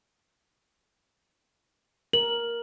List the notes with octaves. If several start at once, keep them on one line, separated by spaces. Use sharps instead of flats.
A#4 F#7